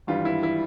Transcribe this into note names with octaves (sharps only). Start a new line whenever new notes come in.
G#1 G2 E3 G3 F4
E4
E4